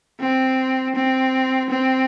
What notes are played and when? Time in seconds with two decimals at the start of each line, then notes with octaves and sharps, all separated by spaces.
0.21 C4
0.95 C4
1.70 C4